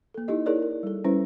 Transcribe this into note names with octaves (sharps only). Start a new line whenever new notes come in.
A#3 A4
D#4 E4 G4 D#5
E4 G#4 A#4 C#5 D5
A#4
G3 A4
G3 C#4 E4 B4 C5